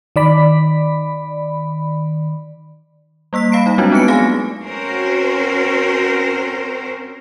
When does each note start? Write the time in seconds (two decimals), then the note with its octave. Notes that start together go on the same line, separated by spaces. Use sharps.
0.16 D#3 D5 B5
3.33 G3 A#3 E6 B6
3.52 F5 B5 C7 D7
3.66 G3 D#4
3.78 F#3 G#3 C4 D4 F4 F#4
3.92 B3 D#4 B4 C#7 D7
4.08 A3 G#4 F5 G#5 A#6
4.62 C4 C#4 F#4 A#4 C5